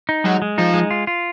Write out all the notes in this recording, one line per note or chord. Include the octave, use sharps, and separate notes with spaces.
D#4
F#3 G#3
G#3
F3 D#4
G#3
F4
F4